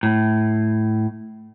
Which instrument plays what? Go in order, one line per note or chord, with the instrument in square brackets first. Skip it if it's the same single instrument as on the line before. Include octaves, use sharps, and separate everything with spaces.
[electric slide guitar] A2